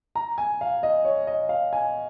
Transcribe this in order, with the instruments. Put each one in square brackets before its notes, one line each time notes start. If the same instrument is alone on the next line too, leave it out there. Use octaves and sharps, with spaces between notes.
[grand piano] A#5
G#5
F5
D#5
C#5
D#5
F5
G#5